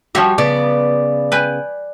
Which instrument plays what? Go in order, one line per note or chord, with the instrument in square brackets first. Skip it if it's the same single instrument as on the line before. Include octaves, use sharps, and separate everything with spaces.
[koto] F3 C#5 E5 [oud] G3 F#4 G4
[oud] C#3 B3 [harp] D5
[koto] B4 G5 G#5